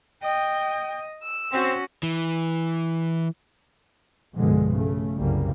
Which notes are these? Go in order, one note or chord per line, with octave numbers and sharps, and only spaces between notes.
D#5 G5
E6
C4 C#4 F#4
E3
B1 G2 B2 D3 F3 G#3
C#3 A3
F#1 C2 C#3 F#3 G3 A#3